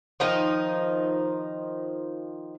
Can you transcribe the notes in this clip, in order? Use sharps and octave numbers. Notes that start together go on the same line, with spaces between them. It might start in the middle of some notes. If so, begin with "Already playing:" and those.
D#3 F3 D#4